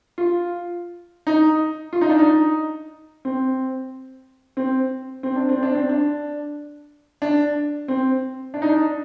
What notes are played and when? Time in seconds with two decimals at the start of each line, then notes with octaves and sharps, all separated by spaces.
0.18 F4
1.27 D#4
1.93 F4
2.01 D#4
2.10 D4
2.19 D#4
3.25 C4
4.57 C4
5.23 C4
5.36 D4
5.49 C4
5.63 D4
5.75 C4
5.89 D4
7.22 D4
7.88 C4
8.54 D4
8.62 D#4
8.69 D4